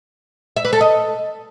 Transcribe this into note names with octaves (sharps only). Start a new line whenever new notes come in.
E5
B4
A4
D#5